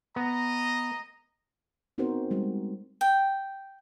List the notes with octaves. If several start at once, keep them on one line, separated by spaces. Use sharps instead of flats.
B3 D#5 A#5
B3 C4 D#4 F#4 A#4 C5
G3 G#3 F#4
G5